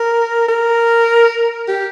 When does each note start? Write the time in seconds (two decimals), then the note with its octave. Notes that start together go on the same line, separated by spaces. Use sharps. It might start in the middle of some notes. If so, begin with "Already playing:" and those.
Already playing: A#4
0.48 A#4
1.68 G4